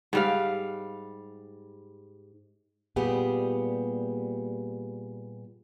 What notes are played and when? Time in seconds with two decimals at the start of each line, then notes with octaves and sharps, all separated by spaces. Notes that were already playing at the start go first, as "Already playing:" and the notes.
0.13 G#2 G3 F5
2.96 A#2 G3 B3 G4 G#4